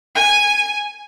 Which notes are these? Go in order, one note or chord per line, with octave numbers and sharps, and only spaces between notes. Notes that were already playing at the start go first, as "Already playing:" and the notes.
G#5